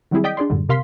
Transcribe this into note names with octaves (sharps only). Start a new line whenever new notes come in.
D#3 F#3 G3 C4 E4 G#4
D5 D#5 G5 D#6 G6 B6
D4 G#4 D5 C6
F#2 A2 D3 G3
C3 A#4 F5 C6 B6